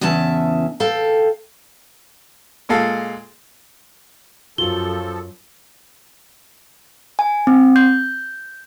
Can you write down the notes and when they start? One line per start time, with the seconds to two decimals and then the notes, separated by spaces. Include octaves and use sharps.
0.01 E2 C#3 E3 E5 A5
0.80 A4 F5 G5
2.69 A#2 G#3 A4 F5
4.58 F#2 F3 F4 F#4 A4 A#4 G7
7.19 G#5
7.47 C4
7.76 G6